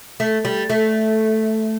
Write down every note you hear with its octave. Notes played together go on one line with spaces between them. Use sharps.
A3
G3
A3